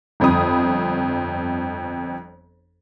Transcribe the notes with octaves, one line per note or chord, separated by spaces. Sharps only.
G1 F2 B5 D#6